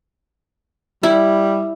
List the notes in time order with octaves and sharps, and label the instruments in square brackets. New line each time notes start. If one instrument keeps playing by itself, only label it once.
[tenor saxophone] G3 [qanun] E4